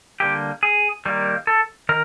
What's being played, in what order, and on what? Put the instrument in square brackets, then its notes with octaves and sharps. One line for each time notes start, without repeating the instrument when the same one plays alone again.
[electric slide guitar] D3 G3 A#3 G4
G#4
D#3 G3 A#3
A4
D#3 A#4